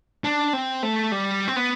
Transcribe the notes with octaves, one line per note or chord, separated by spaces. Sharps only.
D4
C4
A3
G3
C4
B3